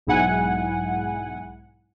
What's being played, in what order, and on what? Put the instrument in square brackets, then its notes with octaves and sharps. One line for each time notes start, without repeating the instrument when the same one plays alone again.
[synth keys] B1 G#2 E4 F#5 G#5